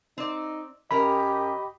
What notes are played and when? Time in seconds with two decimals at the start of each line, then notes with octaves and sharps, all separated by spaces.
0.18 C4 D#4 D5
0.91 F#2 C#4 G4 A#4 D#5 B5